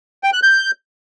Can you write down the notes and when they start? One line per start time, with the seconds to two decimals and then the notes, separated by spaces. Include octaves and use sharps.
0.24 G5
0.33 F#6
0.43 G6